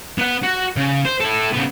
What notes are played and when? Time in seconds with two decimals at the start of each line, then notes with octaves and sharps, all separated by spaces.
0.18 B3 F#5
0.43 F#4
0.76 C#3
1.05 C5
1.20 E4 A4
1.54 C#3 B3